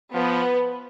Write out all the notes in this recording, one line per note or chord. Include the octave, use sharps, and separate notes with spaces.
F3 B3